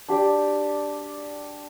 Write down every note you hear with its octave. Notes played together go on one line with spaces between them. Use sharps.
D4 G4 D5